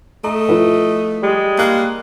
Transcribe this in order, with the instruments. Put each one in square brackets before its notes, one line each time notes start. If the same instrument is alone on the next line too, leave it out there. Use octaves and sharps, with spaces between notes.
[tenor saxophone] A3 [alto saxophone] D#5 [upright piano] A#5
[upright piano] F3 E4 B4
[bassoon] G3 [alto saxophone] G#3
[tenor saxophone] A#3 [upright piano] F#6